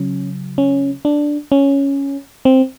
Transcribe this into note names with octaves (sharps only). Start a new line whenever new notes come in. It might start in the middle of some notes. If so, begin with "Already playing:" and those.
Already playing: C#3 F#3 C#4
C#4
D4
C#4
C4